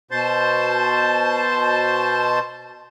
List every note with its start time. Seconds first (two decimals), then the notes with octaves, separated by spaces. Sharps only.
0.11 B2 C5 A5 C6